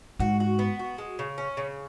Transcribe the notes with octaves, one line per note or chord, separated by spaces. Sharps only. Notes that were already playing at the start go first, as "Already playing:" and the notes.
G#2 F#4
F#4
B3
F#4
G#3
C#3
C#4
C#3